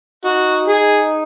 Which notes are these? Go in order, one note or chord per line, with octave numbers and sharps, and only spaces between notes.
D#4 F#4
G#4